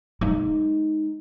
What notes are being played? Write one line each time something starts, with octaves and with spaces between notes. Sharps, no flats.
G#3 D#4